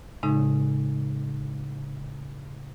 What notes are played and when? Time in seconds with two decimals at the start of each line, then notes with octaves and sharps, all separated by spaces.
0.23 A2 C#3 G#3 D#4